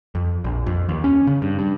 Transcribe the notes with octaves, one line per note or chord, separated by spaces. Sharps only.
F2
A#1
F2
D#2
C#4
C#3
G2
G2